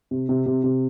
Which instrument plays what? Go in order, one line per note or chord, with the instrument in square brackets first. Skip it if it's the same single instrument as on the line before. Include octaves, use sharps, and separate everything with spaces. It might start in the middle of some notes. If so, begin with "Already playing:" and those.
[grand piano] C3
C3
C3
C3